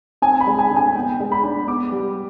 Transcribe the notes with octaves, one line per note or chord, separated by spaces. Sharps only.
C4 G#5
B5
G#3
G#5
D3
G#5
B3 G5
G#3
B5
D4
B3 D6
G3